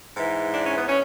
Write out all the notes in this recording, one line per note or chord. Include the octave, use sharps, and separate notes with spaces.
G#2 E3
D4
C#4
B3
C#4